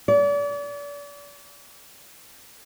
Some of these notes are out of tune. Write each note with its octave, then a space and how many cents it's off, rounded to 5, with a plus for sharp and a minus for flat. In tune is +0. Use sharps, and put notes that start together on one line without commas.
D5 -40